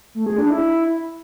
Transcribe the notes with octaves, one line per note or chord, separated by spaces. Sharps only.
A3
G#4
D4
E4